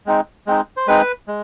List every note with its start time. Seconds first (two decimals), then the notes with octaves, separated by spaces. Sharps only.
0.06 G#3 C4 D#4
0.47 G#3 C4 D#4
0.77 C5
0.87 G#3 C4 D#4 B4
1.28 G#3